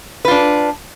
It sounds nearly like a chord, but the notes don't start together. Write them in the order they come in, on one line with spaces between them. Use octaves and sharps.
B4 F4 D4